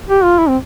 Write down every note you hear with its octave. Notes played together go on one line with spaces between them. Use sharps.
G4
F4
E4
C4